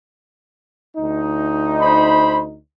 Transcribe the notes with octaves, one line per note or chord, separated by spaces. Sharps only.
D2 D#4
C5 B5